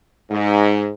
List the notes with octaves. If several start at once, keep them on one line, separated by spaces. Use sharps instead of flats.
G#2